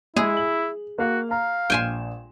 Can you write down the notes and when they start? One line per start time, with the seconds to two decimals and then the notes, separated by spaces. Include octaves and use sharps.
0.16 G#3 E4 G#4
0.37 F#7
0.98 A#3 F#4 F5
1.31 F5 A#5
1.70 A#1 G5 G#5 C6 E7